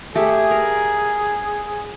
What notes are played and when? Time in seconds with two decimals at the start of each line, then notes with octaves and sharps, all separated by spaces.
0.15 A3 G4 G#4 E5
0.51 A#4